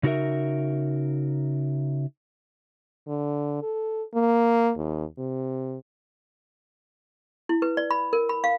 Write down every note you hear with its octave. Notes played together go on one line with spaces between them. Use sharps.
C#3 D#4 F#4 A4 A#4 E5
D3
A4
A#3
D#2
C3
E4
B4
D5
B5
A#4
B5
F5